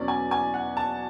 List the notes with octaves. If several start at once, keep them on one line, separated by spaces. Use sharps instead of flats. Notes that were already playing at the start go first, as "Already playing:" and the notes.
Already playing: E2 B2 F#3 C#4 D5
G#5
G#5
F#5
A5